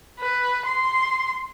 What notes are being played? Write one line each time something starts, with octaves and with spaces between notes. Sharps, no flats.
B4
C6